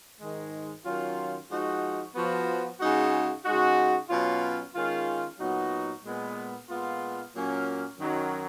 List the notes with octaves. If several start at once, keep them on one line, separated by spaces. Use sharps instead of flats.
G#2 D#3 G#3
D#3 F#3 C#4 F4
F3 G#3 D#4 F#4
F3 B3 F#4
C#3 G#3 D#4 F#4
C#3 G#3 D#4 F#4
B2 F#3 C#4 F4
D#3 G#3 C#4 F4
A#2 F#3 B3 D#4 F#4
A#2 G#3 B3
A#2 G#3 B3 F4
A#2 F#3 A#3 C#4
F#2 D#3 F#3